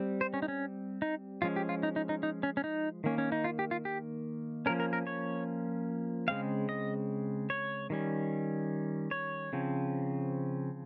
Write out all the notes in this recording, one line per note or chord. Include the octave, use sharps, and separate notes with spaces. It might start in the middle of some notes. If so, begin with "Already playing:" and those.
Already playing: G3 C4
C5
C#4
D#4
C#4
D#4
F3 G#3 C#4 F4
G4
F4
D#4
D#4
D#4
D#4
C#4
C#4
D#4
D#3 A#3 C#4
C#4
D#4
F4
G4
F4
G4
F3 A#3 C#4 A#4
A#4
A#4
C#5
C#3 G#3 C4 F5
D#5
C#5
D#3 G3 C#4
C#5
C#3 F3 C4